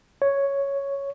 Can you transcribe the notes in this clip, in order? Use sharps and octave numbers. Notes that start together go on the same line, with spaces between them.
C#5